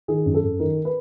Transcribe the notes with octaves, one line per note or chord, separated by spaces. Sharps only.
D#3 G#4
F#2
A4
F#2
D#3 A#4
B4